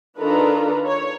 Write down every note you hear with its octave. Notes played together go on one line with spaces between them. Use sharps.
D#3 D4 F4 A4 B4 A#5
C#5